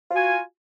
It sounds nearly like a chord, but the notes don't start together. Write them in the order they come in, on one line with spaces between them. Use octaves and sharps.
F4 F#4 G#5